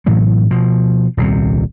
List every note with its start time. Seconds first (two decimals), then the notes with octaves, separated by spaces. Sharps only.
0.06 A2 E3 F#3 A3
0.51 B2 F3
1.17 D#1 C2 C3